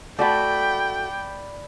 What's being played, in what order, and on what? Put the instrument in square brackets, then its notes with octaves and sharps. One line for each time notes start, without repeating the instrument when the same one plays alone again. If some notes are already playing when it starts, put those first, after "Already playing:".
[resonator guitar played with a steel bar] A3 F#4 [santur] D5 B5 [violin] G5